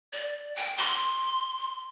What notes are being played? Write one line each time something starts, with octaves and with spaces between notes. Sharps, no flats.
D5
G5
C6